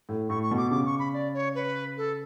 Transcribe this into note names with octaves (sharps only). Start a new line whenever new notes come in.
A2
A2 C#6
C#6
B2
D6
C#3 D6
C#6
B5
D5
C#5
B4
A4